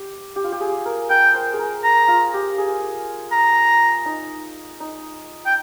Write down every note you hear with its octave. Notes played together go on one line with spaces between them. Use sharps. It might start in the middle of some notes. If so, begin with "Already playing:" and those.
Already playing: G4
G4
F4
G4
G#4
A#4
A#4 G5
C5
G#4
A#4
A#5
F4
G4
G#4
A#5
D#4
D#4
G5